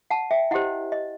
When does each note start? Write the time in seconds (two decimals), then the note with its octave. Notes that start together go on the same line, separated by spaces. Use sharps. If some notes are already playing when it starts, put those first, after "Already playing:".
0.10 F#5 A5
0.31 E5 G5
0.51 E4 G4 C5 D#5 F#5
0.92 D#5